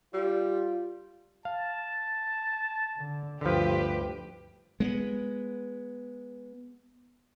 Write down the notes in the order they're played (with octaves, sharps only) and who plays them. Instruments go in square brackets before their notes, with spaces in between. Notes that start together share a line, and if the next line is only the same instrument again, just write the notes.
[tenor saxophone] G3 [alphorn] F4
[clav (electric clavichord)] F5 [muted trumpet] A5
[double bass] D3
[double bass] D2 G2 [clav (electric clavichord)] D3 F3 [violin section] G4 B4 C5
[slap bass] G#3 A#3 B3